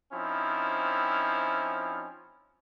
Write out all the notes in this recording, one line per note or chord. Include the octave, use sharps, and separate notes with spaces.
F3 C4 C#4 D#4 E4